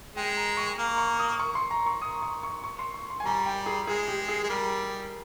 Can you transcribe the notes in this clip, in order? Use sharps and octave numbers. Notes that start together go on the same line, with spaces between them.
G#3 G5
A#5
C#6
A#3
C#6
D#6
C#6
C6
A#5
C#6
D#6
C#6
C#6
C#6
C6
C#6
C6
G#5
G3 A#5
G5
G#4
G#3 G#4
G4
G#4
G#3
G3 A#4